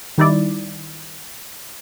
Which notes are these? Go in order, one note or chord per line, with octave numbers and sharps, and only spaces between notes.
D#3 G3 D#4 E4 D5